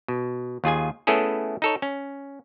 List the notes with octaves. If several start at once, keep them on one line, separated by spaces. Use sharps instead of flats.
B2
D#2 F4 G#4 G#5
A3 B3 C#4 E4 G#4 A4
D#4 A4 C#5
C#4